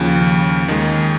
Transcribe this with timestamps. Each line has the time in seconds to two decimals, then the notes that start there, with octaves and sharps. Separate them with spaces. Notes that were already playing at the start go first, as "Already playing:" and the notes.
Already playing: D#2 C#3 F3
0.68 D#2 D#3 G#3